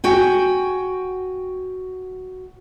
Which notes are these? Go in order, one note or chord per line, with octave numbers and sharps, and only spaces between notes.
F#4 G5 G#5